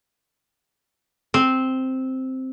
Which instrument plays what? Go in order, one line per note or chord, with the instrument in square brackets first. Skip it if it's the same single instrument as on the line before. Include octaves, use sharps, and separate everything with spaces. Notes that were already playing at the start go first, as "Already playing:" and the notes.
[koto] C4